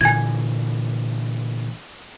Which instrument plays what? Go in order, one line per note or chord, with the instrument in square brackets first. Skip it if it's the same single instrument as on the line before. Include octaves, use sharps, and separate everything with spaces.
[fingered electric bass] A#2 D3 E3 [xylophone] G#5 G#6